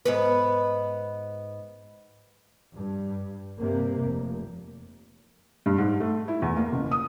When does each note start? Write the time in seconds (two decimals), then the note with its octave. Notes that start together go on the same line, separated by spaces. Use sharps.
0.05 G#2 B3 B4
2.75 G2
3.60 G2 C3 A#3
4.00 F1
5.66 G2
5.78 G#2
6.00 A3
6.28 E4
6.42 E2
6.57 A#3
6.73 F#1
6.91 D#6